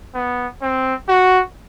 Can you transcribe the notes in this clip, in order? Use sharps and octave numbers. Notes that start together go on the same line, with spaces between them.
B3
C4
F#4